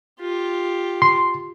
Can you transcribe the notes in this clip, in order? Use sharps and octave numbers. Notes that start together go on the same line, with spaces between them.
F4 G4
C6